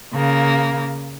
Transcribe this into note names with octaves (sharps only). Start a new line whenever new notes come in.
C#3 A#3